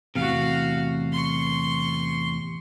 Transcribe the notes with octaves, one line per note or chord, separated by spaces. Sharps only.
E2 A2 C3 F#4 F5
C6 C#6